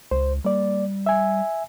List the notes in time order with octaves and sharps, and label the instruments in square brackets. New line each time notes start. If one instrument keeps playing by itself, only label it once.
[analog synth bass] C#2 [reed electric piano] C5
[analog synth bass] G3 [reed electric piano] A#3 D5
[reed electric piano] E5 G#5